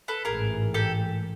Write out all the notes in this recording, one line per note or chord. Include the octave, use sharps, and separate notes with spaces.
A4 B4
A1 G#2 E3 G#4 A#4
G4 A4